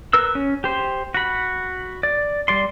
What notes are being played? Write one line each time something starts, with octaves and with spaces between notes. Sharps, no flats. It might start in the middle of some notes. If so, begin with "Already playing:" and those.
A#4 B4 E6
C#4
G4 C5
F#4 B5
D5
G3 D5 C6